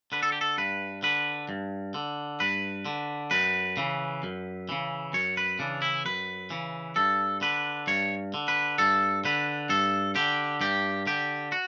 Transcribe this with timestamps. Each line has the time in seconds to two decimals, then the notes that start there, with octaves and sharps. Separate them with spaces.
0.12 D3 B4
0.23 A4
0.32 G4
0.41 A4
0.58 G2 B4
1.03 D3 B4
1.49 G2
1.94 D3
2.40 G2 B4
2.86 D3
3.31 F#2 B4
3.77 C#3 E3
4.23 F#2
4.69 C#3 E3
5.13 F#2 C#5
5.37 B4
5.59 C#3 E3 D4
5.82 E4
6.05 F#2 B4
6.50 C#3 E3
6.96 G2 A4
7.41 D3 B4
7.87 G2 C#5
8.34 D3
8.48 B4
8.78 G2 A4
9.25 D3 B4
9.69 G2 A4
10.15 D3 G4
10.61 G2 G4
11.07 D3 G4
11.52 F#4